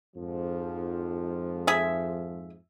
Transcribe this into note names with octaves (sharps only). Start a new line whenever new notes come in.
F2 G#2 F3
G#4 E5